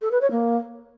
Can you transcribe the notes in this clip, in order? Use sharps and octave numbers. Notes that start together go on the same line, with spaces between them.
A4
B4
C#5
A#3